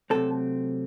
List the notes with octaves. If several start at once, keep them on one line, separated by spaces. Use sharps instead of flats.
C3 F#3 A3 C4 A4